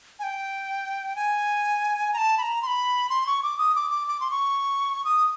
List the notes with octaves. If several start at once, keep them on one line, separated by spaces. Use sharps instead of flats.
G#5
G5
G#5
A#5
A5
B5
A#5
C6
B5
C6
C#6
D6
D#6
D6
D6
D6
C6
C#6
D#6